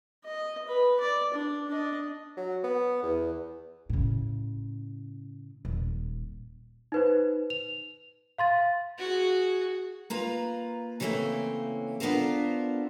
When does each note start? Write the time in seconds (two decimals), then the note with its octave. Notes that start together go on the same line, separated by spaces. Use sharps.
0.25 D#5
0.68 B4
1.00 D5
1.34 D4
1.68 D4 D#5
2.37 F#3
2.64 B3
3.03 E2
3.89 A2 C#3
5.65 D#1
6.92 D#4 B4 C5
7.50 F7
8.38 F5 C6 A6
8.98 F#4 G#4
10.10 A#3 F4 B4 A#5
11.00 C#3 E3 G3 A3 A#3 C4
12.00 B3 D4 F4 A4 A#4 C5